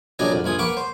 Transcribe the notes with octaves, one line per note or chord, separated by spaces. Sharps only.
A#1 F#3 D4 D#5 G#5
F2
A#1 F3 G#5 D#6
A#3 B4 F#5 C#6 D6
C5